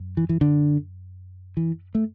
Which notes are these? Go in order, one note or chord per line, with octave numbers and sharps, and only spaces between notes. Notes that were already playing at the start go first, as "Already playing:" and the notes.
Already playing: F#2
E3
E3
D3
E3
A3